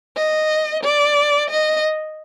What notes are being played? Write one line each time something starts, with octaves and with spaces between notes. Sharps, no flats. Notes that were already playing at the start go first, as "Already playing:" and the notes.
D#5
D5
D#5